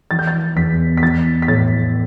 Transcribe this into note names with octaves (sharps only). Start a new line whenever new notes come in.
E3 A6
G6
A6
E2 B6
B6
E3 A6
B6
A2 A6